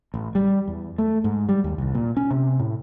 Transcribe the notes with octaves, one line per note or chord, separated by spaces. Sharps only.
A1
G3
E2
A3
G#2
G3
D#2
C2
A#2
C#4
C3
A2